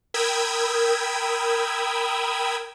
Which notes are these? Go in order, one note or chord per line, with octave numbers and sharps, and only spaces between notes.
A#4 G5 B5 D#6 E6 G#6